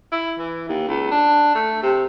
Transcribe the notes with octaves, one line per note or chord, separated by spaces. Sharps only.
E4
E3
D#2
C#2
D4
A3
C3